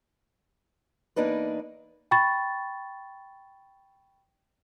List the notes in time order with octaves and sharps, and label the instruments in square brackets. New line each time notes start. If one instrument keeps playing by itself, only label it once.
[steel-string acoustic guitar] E2 A#3 D4 D#4 B4
[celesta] G5 B5 C#6 A6